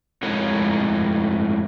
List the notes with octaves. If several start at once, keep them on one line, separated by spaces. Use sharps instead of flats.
F2 A2 G#3 A#4 C#5